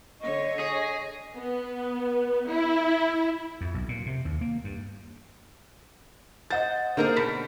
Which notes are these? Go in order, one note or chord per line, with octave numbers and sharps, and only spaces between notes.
D3 C#5 D#5 C#6
G#4
B3
E4
F2
B1
A#2
C3
D#2
A#3
G2
C5 D#5 F#5 A6
D3 A#3 D#4 G#4 A#4 C5
B2 B6